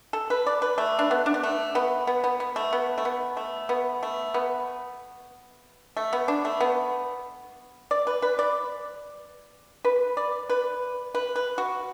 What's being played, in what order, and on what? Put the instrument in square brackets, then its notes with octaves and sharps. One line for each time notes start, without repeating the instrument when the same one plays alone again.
[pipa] A4
B4
D5
B4
A3
D4
B3
D4
B3
A3
B3
B3
B3
B3
A3
B3
A3
B3
A3
B3
A3
B3
A3
B3
D4
A3
B3
D5
B4
B4
D5
B4
D5
B4
B4
B4
F#4